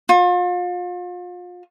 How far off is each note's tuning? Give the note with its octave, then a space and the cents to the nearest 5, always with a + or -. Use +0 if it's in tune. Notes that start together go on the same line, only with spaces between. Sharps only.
F4 +35